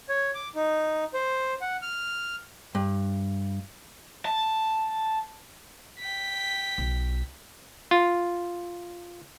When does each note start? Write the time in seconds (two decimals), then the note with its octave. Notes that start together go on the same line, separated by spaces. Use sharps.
0.09 C#5
0.34 D6
0.55 D#4
1.14 C5
1.61 F#5
1.82 F6
2.75 G2
4.25 A5
5.99 G5 B6
6.78 B1
7.91 F4